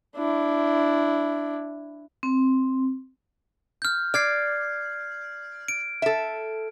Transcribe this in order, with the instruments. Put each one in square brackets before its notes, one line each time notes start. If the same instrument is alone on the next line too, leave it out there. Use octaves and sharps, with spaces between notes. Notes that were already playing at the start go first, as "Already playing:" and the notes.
[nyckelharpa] D4 E4
[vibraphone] C4
[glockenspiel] F6 G6
[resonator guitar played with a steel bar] D5 [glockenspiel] F6 G#6 C7
[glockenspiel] D7
[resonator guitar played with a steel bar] A4 E5